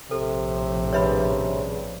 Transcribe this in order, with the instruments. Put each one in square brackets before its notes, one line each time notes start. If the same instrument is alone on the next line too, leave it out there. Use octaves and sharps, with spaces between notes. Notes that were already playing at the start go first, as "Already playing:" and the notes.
[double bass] A#1 A2 [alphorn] C3 [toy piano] A4
[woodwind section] G2 C#3 [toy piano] C#5 E5 B5